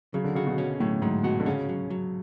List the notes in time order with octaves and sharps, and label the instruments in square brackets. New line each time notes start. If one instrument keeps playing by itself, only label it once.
[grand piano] C#3 [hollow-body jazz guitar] F#3
[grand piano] D3
[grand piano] C#3 [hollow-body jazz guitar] F#4
[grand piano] B2
[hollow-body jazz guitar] C#4
[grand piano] A2 [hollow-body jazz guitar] F#3
[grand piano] G#2 [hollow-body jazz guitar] F#3
[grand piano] B2 [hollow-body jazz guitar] F#4
[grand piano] D3
[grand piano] C#3 [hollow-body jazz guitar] C#4
[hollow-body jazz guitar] F#3
F#3